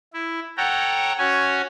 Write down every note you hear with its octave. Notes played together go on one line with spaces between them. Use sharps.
E4
A4 C#5 F#5 G5 A#5
C#4 F#4 C#5 G#5